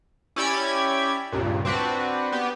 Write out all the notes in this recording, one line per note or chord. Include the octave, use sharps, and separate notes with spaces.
C#4 E4 G4 D5 B5 G#6
C#2 G2 A#2
C4 D4 F#4 B4
B3 G4